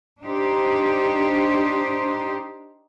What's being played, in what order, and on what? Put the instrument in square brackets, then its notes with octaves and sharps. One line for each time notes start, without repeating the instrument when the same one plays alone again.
[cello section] D4 D#4 G4 C5